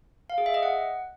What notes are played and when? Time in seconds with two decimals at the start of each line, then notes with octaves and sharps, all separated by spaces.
0.30 F5
0.38 G#4
0.46 E5
0.54 D#5
0.63 F#5